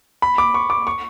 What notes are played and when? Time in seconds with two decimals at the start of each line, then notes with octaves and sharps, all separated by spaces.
0.22 B5
0.38 D6
0.54 C#6
0.70 D6
0.87 C#6